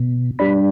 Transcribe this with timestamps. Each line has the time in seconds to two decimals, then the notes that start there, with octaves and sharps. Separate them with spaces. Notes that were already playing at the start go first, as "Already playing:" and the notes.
Already playing: B2
0.39 G3 D4 B5